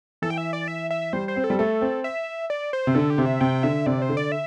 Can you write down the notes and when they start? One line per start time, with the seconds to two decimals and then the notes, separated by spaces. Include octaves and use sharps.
0.22 E3 A4
0.30 G5
0.38 E5
0.53 D5
0.68 E5
0.91 E5
1.13 G3 C5
1.28 C5
1.36 C4
1.44 A4
1.50 G3
1.59 A3 A4
1.81 C4
2.04 E5
2.50 D5
2.73 C5
2.87 C3
2.95 D3 A4
3.10 G4
3.18 C3
3.26 E5
3.41 C3 G5
3.63 D3 E5
3.86 C3 D5
4.02 C5
4.09 D3
4.17 D5
4.32 E5